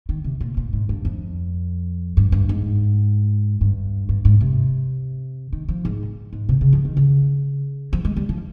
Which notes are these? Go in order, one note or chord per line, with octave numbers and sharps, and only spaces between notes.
D#3
C3
A#2
A#2
G#2
G2
F2
G2
G2
G#2
G2
G2
G#2
C3
D#3
F3
G#2
G#2
C3
C#3
F3
D#3
C#3
F3
G#3
G3
F3